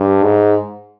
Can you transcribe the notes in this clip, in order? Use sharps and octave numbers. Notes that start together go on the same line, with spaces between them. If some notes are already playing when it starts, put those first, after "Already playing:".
Already playing: G2
G#2